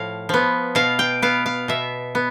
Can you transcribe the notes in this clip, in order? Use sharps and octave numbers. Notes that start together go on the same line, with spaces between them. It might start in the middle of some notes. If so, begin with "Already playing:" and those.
Already playing: A2 F3 F5
F3 B3
B2 F5
G5
B3 F5
F5
B2 E5
B3